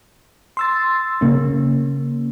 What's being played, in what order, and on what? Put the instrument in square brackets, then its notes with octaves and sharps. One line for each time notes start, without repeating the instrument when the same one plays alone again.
[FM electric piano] C6 E6 A6
C#3 A#3 C#4